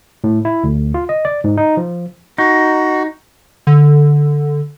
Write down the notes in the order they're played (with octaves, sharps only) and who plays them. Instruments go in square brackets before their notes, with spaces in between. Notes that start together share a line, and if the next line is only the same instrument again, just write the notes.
[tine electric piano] A2
E4
D2
F4
D#5
D5
G#2
D#4
F3
[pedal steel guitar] D#4 [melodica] F#4
[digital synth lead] D3